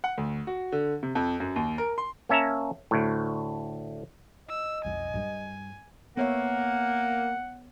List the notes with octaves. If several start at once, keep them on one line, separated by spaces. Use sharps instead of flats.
F#5
D2
F#4
D3
C3
F2
F#2
D#2
A#4
C6
A#3 C#4 E5 A5 A#5
D2 A2
D#5 E6
B1 F2 G#5
G2 G3
A#3 B3 C#5 E5 F#5